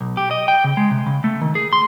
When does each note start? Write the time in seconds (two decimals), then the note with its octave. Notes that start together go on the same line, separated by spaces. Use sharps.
0.01 B1
0.17 G4
0.31 D#5
0.48 G5
0.64 C#3
0.77 G#3
0.91 C3
1.06 C#3
1.24 A3
1.41 D#3
1.55 G#4
1.73 C6